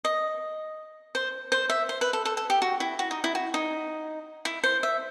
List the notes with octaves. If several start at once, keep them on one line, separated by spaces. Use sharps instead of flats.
D#5
C5
C5
E5
C5
B4
A4
A4
A4
G4
F#4
E4
F#4
D#4
E4
F#4
D#4
E4
C5
E5